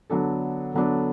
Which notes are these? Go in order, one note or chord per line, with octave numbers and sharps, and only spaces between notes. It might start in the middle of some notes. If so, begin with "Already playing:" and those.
D3 F#3 B3 D4 A4
D3 F#3 B3 D4 A4